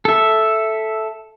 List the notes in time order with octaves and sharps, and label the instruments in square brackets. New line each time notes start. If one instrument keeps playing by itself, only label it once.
[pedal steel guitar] A4 E5